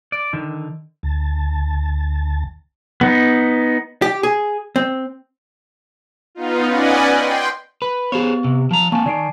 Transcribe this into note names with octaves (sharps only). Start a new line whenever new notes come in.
D5
D3 D#3
D2 A5
B3 D#4
G4
G#4
C4
B3 D#4 F4
C#4 B4 D5 D#5 F#5 G#5
G5 C6
B4 B5
B3 G4 G#4 C5 C#5
C3
F3 A5 A#5
A#3 C4 G#5 A5 C#6
D#3 D5 C7 D7